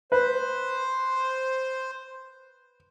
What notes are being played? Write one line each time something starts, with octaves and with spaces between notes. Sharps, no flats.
B4 C5